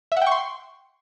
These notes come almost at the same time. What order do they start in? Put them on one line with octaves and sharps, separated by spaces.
E5 F#5 G5 C#6 C6